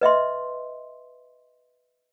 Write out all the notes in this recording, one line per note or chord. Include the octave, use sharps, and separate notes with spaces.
B4 D#5 E5 C6